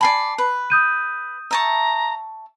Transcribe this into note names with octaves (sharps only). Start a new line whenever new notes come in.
D5 G#5 A5 B5 C7
B4
D#6 G6 D#7
E5 A5 A#5 C#6